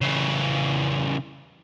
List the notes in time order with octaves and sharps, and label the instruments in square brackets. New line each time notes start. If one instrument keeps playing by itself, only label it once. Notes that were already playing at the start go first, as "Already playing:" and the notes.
[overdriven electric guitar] C#3 E3